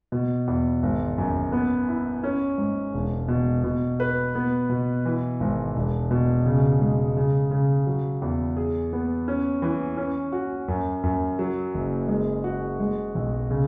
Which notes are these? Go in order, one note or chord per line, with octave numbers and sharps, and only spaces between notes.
B2
E2
G#1
F#2
B3
E4
C#4
G#2
E1
B2
B2
B4
B3
B2
E3
G#1
E1
B2
C#3
G#3
C#3
C#3
F#3
E2
G#4
B3
C#4
E3
C#4
F#4
F#2
F#2
F#3
F#1
G#3
F#4
G#3
B1
C#3